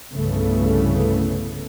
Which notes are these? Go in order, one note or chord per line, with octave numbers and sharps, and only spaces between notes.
C2 G2 C#3 E3 A3 B3